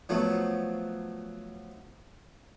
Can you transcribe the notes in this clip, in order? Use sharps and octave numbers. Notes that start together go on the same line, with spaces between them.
F3 F#3 A3 B3